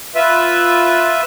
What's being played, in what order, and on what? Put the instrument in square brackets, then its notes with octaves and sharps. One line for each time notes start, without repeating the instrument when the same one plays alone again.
[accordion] F4 B4 E5